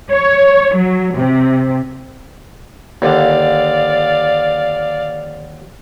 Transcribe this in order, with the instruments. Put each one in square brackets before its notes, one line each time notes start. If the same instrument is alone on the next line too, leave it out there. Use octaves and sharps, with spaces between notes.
[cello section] C#5
F#3
C3
[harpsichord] D#2 D3 [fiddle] D5 F5